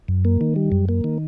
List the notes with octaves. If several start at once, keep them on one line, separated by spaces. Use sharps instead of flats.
F#2
A#3
D#3
G3
F#2
A#3
D#3